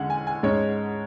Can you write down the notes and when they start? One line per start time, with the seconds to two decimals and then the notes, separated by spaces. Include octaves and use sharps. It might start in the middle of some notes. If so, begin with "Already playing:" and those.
Already playing: E2 D3 G#3 C#4 F#5
0.10 G#5
0.27 G#5
0.43 G#2 G#3 C#4 C#5